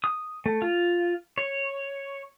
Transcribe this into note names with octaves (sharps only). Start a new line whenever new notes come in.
D#6
A3
F4
C#5